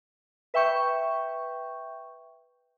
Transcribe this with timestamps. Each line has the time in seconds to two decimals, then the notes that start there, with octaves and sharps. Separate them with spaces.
0.54 B4 E5 G5 C#6 G6